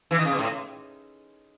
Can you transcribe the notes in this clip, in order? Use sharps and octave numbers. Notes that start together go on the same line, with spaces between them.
E3
D#3
C#3
B2
A2